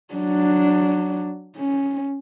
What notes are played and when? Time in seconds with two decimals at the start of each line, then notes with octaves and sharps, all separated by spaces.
0.14 F#3 D4
1.57 C#4